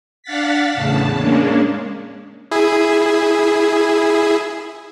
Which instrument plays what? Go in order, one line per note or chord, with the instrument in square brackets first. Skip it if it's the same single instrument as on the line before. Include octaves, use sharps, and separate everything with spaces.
[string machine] D4 F5 F#5 A6 B6
E2 A2 C#3 A5
G#3 A#3 C#4 D4
[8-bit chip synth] E4 G#4